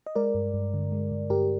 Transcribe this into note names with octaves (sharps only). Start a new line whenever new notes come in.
D#5
G#3 A#4 D5
G2
G2
D3
G#3
G2
G2 G4 A#4